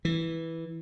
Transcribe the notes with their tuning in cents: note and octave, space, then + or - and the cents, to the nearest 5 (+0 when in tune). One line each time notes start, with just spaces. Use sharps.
E3 -5